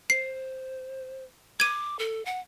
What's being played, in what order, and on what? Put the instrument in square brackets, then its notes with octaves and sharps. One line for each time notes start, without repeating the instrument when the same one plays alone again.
[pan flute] C5 [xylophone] C7
[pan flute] D6 [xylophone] G#6 D#7
[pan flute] A4
F#5